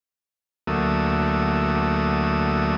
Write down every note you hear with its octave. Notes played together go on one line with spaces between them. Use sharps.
D2 F#3 A3 A#3 E5 D#6